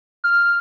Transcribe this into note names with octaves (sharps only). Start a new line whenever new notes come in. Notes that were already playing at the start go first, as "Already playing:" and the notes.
F6